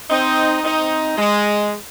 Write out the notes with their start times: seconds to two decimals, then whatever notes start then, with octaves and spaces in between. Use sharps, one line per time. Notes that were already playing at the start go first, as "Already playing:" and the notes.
0.09 C4 D#4
0.64 C4 D#4
1.18 G#3